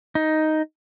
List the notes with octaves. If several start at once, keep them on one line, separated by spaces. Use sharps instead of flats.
D#4